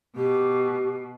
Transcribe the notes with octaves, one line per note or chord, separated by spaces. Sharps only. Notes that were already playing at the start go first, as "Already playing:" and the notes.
B2 G4